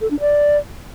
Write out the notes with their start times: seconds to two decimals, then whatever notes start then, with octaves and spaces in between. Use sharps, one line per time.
0.01 A4
0.11 D4
0.20 D5